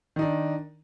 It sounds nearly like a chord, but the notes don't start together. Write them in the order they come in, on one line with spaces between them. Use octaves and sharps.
D#3 D#4 D4